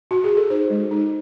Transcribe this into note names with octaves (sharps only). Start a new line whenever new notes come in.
F#4
G#4
A4
D#4 C5
G#3
D#4